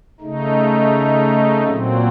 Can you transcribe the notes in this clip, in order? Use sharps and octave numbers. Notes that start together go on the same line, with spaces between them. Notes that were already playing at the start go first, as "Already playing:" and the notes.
C#3 A3 D#4
A#2 F#3 C4